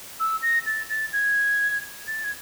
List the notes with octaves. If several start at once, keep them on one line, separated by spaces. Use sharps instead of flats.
E6
A#6
A6
A6
G#6
A6
G#6